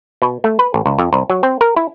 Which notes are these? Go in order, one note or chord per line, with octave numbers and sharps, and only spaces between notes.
B2
A3
B4
A1
C#2
F2
C2
F#3
C4
A#4
E4